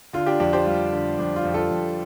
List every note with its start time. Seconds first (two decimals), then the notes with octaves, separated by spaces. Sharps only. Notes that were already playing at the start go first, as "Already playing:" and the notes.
0.13 D3 F4
0.26 D4 G4
0.40 F2 D4 G4
0.53 G4 C5
0.66 G3 F4
0.93 D3
1.19 F2 D4
1.36 F4
1.45 F2
1.54 F4 A4
1.71 F2